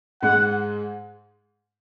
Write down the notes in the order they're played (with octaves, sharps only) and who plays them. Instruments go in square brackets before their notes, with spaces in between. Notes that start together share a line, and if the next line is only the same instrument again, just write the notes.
[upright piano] G#2 G#3 [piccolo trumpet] F#5